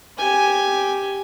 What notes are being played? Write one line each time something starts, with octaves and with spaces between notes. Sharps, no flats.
G4 G#5